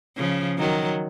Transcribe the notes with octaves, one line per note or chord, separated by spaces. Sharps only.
C#3 F3
D#3 F#3